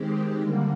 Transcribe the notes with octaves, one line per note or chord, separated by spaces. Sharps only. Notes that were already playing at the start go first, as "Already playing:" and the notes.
Already playing: D#3 G#3 C4 G4
D3 G3 A#3